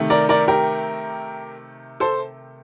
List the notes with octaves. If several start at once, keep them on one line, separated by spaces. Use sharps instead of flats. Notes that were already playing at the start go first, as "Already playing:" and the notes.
Already playing: C3 D#3 A3
A#4 D5
A#4 D5
G4 A#4
A4 C5